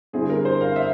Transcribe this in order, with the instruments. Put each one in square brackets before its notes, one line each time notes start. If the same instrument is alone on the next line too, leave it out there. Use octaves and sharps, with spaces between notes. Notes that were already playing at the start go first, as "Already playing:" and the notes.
[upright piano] D3 G3 C4 E4 G#4
A#4
C5
F5
E5